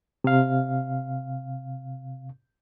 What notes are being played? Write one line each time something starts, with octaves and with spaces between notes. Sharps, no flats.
C3 F5